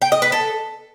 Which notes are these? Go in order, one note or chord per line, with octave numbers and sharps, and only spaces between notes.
G5
D#5
B4
A4